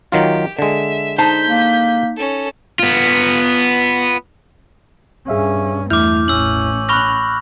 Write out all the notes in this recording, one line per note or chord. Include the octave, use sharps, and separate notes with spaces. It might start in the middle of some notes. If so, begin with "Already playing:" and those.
D#3 F#3 F4 G4
D3 G#3 E5
D#4 C5 A5 G6 B6
A#3
C#4 A4
B3 F4
G2 C#4 G#4 E5 F5
E2 A3 E4 D6 F6 G6
A1 C#4 E6 F#7
B5 C#6 F6 F#6 A#6